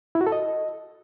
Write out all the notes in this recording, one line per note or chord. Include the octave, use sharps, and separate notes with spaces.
E4
F#4
A4
D#5